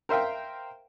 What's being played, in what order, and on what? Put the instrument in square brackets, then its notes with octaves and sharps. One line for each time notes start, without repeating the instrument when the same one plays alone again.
[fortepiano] A#4 C5 E5 F5 G5